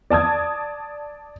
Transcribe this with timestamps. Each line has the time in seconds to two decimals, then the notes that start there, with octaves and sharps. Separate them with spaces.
0.10 D5 A5 D#6 G#6